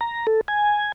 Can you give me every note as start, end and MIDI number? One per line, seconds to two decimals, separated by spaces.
0.01 0.27 82
0.27 0.41 69
0.48 0.92 80